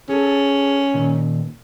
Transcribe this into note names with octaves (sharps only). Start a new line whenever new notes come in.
C#4 G#4 A4
A#2 D#3